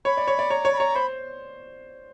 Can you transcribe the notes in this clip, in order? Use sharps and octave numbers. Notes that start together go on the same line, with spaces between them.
C#5 B5
D5
C#5
D5
C#5 A#5
C#5
B5
C#5 A#5
C5 B5